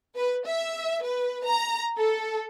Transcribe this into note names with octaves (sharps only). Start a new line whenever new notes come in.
B4
E5
B4
A#5
A4